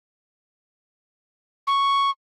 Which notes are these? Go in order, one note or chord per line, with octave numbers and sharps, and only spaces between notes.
C#6